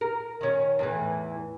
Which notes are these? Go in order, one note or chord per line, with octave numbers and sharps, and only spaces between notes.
A#4
D#3 C#4
E2 A2 E3